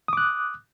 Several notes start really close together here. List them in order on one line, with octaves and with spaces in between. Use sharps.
D#6 D6 F#6